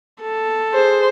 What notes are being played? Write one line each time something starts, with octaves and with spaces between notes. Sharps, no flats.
A4
G#4 C5